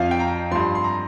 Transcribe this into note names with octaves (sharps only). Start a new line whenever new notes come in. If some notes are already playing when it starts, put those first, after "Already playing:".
Already playing: F2 F3 F5
G5
A#5
G2 F3 C6
C6
A#5